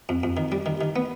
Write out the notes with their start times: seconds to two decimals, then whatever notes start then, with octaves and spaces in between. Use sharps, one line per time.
0.09 F2
0.23 F2
0.37 D#3
0.52 G3
0.66 D#3
0.81 D#3
0.96 B3